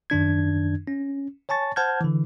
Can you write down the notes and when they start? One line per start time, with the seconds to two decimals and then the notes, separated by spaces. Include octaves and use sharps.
0.10 F#2 D#3 D4 G#6
0.87 C#4
1.49 C#5 G#5 A5 C#6 A6
1.76 C5 F#5 A5 F6 G6 G#6
2.01 D3 E3